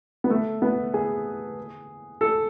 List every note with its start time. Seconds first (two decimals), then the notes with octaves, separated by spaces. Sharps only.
0.24 B3
0.30 A3
0.62 B3
0.94 G#4
2.21 A4